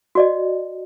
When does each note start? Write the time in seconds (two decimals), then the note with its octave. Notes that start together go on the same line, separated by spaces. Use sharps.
0.15 F#4 D5 D#5